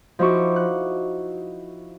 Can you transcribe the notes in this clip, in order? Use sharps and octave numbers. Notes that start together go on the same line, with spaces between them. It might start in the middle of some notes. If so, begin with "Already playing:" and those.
F3 D#4 E4 F#4 C#6 D6
F#6